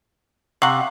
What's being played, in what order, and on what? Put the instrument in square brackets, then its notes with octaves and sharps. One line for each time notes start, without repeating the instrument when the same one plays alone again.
[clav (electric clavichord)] C3 [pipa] F5 F#5 [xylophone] C#6 F#7